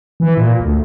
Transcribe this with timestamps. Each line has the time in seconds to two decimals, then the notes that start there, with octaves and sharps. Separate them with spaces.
0.20 E3
0.37 A#2
0.60 D2